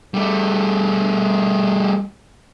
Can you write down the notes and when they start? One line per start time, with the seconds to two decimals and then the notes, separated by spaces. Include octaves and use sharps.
0.14 G3 A3